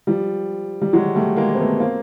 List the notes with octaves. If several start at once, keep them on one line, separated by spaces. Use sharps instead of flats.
F3 G3
G3
F#3 G#3
G3 A3
G#3 A#3
C4
A3 B3
A#3 C4